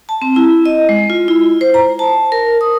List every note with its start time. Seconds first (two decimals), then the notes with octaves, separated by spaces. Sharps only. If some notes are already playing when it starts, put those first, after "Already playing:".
0.09 A5
0.22 C4
0.36 E4
0.66 D#5
0.89 G#3
1.10 F4
1.28 E4
1.61 C5
1.74 A#5
1.99 A5
2.32 A#4
2.61 D#6